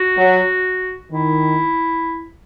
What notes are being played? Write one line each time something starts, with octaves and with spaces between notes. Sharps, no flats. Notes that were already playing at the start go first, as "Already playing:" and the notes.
Already playing: F#4
F#3
D#3 E4